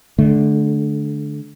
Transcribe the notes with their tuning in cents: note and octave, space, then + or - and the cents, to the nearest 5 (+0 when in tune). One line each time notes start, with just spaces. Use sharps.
D3 +0 A3 -30